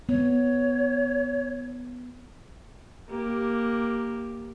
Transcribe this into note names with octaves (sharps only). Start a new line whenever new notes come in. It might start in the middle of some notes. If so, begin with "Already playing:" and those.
B3 C#5
A#3 G4